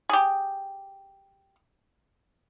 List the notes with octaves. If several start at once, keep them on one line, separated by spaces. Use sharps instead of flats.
G4 G#4